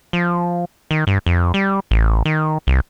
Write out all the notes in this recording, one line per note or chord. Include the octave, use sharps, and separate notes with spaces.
F3
D#3
G2
F2
G3
A1
D#3
C2